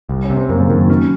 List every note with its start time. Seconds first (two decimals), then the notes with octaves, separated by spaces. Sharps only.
0.09 C2
0.23 C#4
0.30 C3
0.36 C4
0.49 F#2 A#3
0.60 C#3
0.69 F#2 D#3
0.89 F#3 C#4